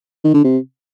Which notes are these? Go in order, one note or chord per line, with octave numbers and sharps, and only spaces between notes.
D#3
D3
C3